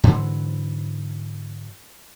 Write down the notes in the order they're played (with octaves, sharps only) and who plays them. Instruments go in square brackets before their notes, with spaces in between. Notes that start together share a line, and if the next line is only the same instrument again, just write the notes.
[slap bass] G#2 D3 E3 F#3